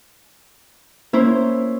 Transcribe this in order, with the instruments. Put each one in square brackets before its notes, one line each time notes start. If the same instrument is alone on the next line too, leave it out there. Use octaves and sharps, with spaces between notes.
[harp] A#3 C#4 E4 C5 C#5